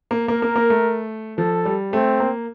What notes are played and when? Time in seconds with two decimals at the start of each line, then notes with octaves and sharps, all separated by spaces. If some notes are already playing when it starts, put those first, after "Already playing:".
0.11 A#3
0.28 A#3 A#4
0.42 A#3
0.56 A#3
0.70 A3
1.38 F3 A4
1.65 G3
1.93 A3 C4
2.20 A#3